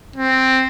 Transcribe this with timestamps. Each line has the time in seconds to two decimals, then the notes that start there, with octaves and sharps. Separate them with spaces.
0.16 C4